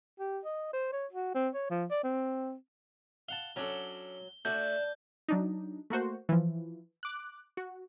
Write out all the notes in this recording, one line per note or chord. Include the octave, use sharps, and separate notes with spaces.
G4
D#5
C5
C#5
F#4
C4
C#5
F3
D5
C4
F5 F#5 A5 G7
F#3 C#4 D4 A4
A3 D4 F#4 G6
F#3 D4 D#4
A3 A#3 F#4 C5
E3 F3
D6 F#6
F#4